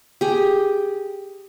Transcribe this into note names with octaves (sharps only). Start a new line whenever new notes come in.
G4 G#4